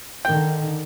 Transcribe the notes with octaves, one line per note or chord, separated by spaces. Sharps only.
D3 D#3 G5